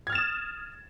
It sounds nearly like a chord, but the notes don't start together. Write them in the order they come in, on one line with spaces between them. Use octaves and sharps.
G#6 F6 A6 E7 D#6